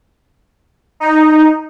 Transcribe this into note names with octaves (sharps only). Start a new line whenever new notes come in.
D#4